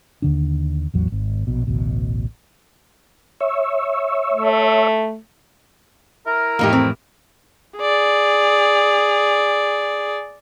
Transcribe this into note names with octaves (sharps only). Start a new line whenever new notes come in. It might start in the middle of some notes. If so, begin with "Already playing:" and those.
D#2 D3 D4
A1 E2 F#3
G#1
A#1 B2
A1 D2 B2
C#5 E5
A3
E4 A#4
F2 A2 E3 A#3 D#4 G4
C4
G#4 D5